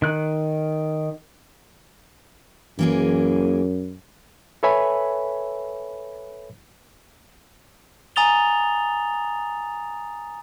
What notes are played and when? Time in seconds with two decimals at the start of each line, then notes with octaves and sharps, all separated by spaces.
0.02 D#3 F#6
2.79 F#2 E3 A#3 G#4
4.63 A4 B4 C#5 E5 G#5 B5
8.16 G#5 A#5 D#6 A6 F7 G7